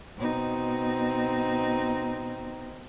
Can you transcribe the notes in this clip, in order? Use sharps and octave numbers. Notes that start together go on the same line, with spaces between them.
B2 C4 D#4